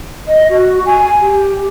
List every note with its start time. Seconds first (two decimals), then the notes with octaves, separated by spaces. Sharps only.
0.27 D#5
0.49 F#4
0.85 G#5
1.21 G4